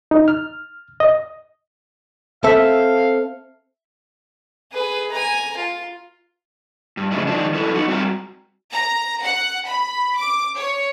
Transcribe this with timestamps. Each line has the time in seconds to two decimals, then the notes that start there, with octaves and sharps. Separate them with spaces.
0.11 D#4
0.28 F6
1.00 D#5
2.44 C4 A4 E5 F5
4.72 G#4 B4
5.11 G#5 A#5
5.57 F4
6.97 G2
7.12 F2 A2 C#3 F#3 G#3 E4
7.27 D#3 F3 G#3 D4
7.54 F#3 E4 A4 B4
7.74 D#4 F#4
7.88 G3 C4 F#4 F5 G5 A#5
8.73 A#5
9.23 F#5
9.67 B5
10.17 D6
10.56 C#5